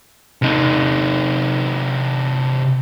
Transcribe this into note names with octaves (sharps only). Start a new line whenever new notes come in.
C3 D#4